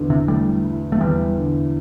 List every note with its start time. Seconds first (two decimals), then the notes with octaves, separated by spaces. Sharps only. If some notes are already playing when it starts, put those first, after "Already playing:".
Already playing: E2 D3
0.10 C3
0.28 G3 A3
0.64 E4
0.92 A3
1.01 E2 G3
1.37 D3